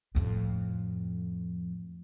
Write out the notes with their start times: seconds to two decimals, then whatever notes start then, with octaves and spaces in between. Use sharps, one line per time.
0.15 F2 A2